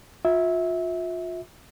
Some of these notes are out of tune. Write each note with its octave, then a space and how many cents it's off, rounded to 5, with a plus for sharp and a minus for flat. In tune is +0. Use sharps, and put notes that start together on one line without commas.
F4 +35 E5 -20